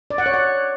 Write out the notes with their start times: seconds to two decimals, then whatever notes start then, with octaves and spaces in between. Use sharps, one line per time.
0.10 D5
0.18 F#5
0.26 C#5
0.34 F#5